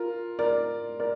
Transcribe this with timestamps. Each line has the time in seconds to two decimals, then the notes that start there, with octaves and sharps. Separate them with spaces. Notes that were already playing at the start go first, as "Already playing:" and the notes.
Already playing: F4 A#4
0.39 A#4 D5
1.00 A#4 D5